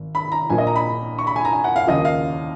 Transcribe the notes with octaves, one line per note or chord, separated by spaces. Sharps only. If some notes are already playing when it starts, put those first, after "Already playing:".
Already playing: G#1
B5
A#5
A#1 A#2 F3 G#5
D#5
A#5
B5
C#6
B5
G#5
A#5
G#5
F#5
F5
D#2 C#3 F3 D#5
F5